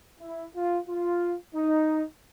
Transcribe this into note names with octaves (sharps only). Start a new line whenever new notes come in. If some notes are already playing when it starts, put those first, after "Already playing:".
E4
F4
F4
D#4